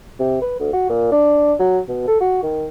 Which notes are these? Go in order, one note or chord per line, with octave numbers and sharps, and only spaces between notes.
C3
B4
D2
F#4
A#2
D4
F#3
B2
A4
F#4
D#3